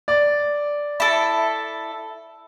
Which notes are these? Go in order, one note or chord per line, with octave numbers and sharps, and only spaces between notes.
D5
E4 A4